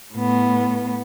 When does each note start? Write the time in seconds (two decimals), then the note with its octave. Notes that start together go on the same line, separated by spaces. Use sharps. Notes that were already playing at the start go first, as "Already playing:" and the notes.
0.14 A2 B3